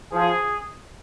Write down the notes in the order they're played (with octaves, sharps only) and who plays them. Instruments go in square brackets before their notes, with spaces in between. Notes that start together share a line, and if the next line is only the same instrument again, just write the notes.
[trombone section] F3 [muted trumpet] G#4